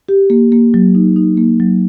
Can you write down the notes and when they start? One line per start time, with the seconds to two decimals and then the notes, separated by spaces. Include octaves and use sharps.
0.09 G4
0.30 A#3
0.52 A#3
0.74 F#3
0.95 D#4
1.16 D#4
1.37 A#3
1.60 F#3